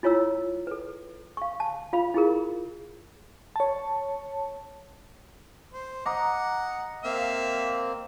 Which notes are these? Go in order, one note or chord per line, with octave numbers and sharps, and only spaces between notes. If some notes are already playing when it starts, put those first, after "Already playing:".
E4 F4 C#5 A#5 E6
A4 B4
F5 C#6
A5
F4 F5 B5
E4 F4 G#4 A#4
C#5 A5
C5
D#5 F#5 A#5 D6
A#3 C4 E5 F5